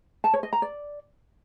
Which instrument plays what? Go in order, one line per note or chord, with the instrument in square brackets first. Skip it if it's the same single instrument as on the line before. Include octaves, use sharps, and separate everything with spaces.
[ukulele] A5
C#5
D#5
A#5
D5